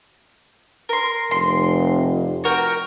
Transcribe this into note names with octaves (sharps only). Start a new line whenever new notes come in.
A#4 C6
F1 C6
F#4 A#4 G5